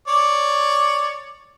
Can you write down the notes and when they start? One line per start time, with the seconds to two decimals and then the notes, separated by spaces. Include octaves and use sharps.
0.08 C#5 D5